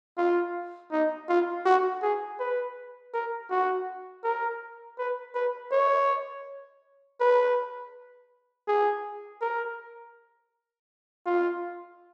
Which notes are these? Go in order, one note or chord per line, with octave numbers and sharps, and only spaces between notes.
F4
D#4
F4
F#4
G#4
B4
A#4
F#4
A#4
B4
B4
C#5
B4
G#4
A#4
F4